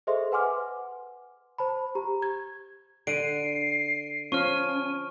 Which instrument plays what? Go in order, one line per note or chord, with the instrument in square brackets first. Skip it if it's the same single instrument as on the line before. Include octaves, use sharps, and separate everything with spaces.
[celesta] G#4 A4 C5 D#5 E5 C6
B4 F#5 G#5 C6 D6 F6
C5 A5 B5
G4 A#5
G#6
[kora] D3 [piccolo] C7 [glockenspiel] D7 D#7
[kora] F3 [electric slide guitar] C#4 [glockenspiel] C#6 F6 [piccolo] D#7